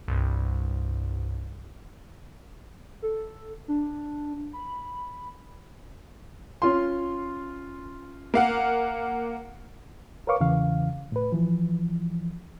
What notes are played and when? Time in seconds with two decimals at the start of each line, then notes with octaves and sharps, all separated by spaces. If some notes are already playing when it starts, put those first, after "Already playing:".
0.08 C2 G2
3.02 A4
3.68 D4
4.53 B5
6.62 C#4 F4 C6
8.34 A#3 F5 F#5
10.27 A#4 B4 C#5 F5 C#6 D6
10.40 E2 C#3 E3 F5
11.12 A2 B4
11.32 E3 F3